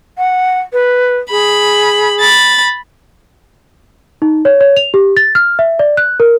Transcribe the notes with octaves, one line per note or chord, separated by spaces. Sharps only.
F#5
B4
G#4 B5
B5 A6
D#4
C#5
C#5
F7
G4
A6
F6
E5
D5
F#6
A#4